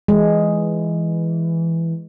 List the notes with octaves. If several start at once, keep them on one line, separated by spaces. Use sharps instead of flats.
E3 G#3